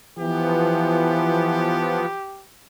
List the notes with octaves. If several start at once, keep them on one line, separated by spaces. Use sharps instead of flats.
E3 F3 B3 G4